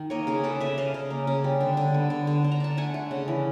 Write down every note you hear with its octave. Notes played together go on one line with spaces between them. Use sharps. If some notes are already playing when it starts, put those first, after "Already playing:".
Already playing: D#3
A#3 C#5 D#5
C#3 G#4 A#4
C#3 A4 B4
C#3 D5 E5
C#3 D#5 F5
C#3
A#3
C#3
G3
D3
D3
B3
D3
D3
D3
A#5
D3 A5
A3 F#5 G#5
A3
C#3
E3